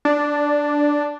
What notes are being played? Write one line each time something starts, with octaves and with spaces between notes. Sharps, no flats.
D4